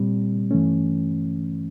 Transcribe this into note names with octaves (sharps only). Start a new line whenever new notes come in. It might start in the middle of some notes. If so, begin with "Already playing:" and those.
Already playing: A#2 G3 C4
G2 E3 A3 C#4